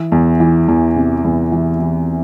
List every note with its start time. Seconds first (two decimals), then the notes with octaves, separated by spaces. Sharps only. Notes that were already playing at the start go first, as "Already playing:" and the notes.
Already playing: E3
0.12 E2
0.40 E3
0.68 E2
0.96 C3
1.24 E2
1.52 E3
1.80 E3